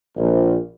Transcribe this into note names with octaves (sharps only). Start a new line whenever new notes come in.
A#1